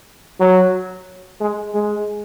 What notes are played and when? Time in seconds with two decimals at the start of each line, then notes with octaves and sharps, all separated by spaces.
0.40 F#3
1.40 G#3
1.74 G#3